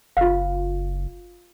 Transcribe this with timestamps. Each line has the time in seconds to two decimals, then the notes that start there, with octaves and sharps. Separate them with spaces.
0.17 F#1 F4 F5